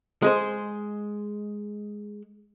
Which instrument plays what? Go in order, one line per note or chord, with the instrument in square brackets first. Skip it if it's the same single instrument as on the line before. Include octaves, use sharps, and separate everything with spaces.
[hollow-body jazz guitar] G#3 G#4 C5